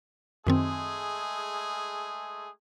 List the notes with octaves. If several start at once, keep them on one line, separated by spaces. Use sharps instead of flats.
F#2 D#3 G#3 A3 C4 G#4